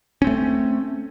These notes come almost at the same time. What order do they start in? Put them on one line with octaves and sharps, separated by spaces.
C#4 C4 A3